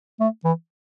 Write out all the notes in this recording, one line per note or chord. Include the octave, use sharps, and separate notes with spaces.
A3
E3